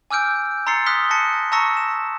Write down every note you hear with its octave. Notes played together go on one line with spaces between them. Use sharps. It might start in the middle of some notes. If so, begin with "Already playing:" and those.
G#5 D6 E6 F6 G6 D7
A#5 C6 E6 A6 C7 C#7
D#6 F6 F#6 B6 G7
A5 A#6 C#7
A5 A#5 C#6 E6 A#6 C#7
E7